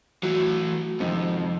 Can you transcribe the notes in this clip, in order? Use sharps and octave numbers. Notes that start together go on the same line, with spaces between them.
E3 F#3 A3
F2 G#2 C3 D#3